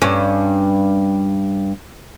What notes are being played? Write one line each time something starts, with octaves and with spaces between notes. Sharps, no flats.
G2 C#4